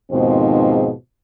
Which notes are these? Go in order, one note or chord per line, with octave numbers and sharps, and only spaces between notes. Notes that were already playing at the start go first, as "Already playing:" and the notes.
D#2 G#2 B2 F3 G#3 C4